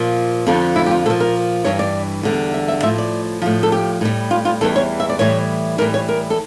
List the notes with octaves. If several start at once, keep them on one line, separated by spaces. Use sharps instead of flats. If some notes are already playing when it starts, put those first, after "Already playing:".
Already playing: A#2 F3
F2 D3 F3 D4
E4
G4
F4
A#2 F3 A4
A#4
G2 E3 G3 C#5
D5
E2 D3 G3
E5
E5
A2 F3 E5
D5
A2 F3
A4
G4
A2 G3
F4
F4
E2 E3 G3 A4
C#5
E5
D5
A2 E3 G3 C#5
A2 E3 G3 A#4
C#5
A#4
A4